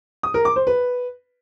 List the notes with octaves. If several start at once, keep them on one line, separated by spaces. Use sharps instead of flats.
D#6
A#4
D6
C5
B4